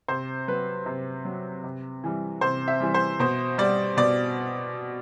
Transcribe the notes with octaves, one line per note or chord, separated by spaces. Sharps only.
C3 C5
F#3 B4
C3
F#3
C3
E3 G3
C3 C5
E5
E3 G3
C5
B2 C5
G3 D5
B2 D5